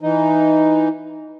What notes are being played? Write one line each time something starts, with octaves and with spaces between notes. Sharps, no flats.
E3 D#4